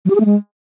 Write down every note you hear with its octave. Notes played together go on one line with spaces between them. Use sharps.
F#3
G4
G#4
A3
G#3